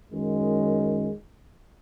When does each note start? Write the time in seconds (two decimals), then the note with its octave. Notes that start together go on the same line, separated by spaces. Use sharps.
0.11 F#2 D#3 G#3